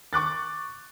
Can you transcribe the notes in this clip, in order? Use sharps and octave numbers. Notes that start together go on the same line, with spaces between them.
C#6 D6 F#6 A6